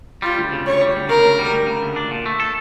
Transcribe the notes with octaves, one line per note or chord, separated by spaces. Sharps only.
G3 F4
D2
C#3
D2 C#5
G3
D2
C#3 A#4
D2
G3
D2
C#3
D2
D4
A#2
A3
A4